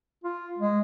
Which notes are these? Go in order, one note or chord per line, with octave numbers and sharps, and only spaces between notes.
F4
G#3